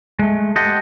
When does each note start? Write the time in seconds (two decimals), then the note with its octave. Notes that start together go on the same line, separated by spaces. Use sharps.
0.19 G#3 A3
0.56 G4 A4 C5 D#5 F#5